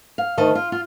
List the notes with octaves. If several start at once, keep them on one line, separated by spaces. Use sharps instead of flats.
F5
D2 D#3 D#5 A5
F4
F4